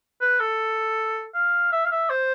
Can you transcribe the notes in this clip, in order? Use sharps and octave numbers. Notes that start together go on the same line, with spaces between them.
B4
A4
F5
E5
F5
E5
C5